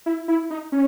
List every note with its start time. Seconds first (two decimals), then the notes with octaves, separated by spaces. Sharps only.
0.06 E4
0.28 E4
0.50 D#4
0.72 C#4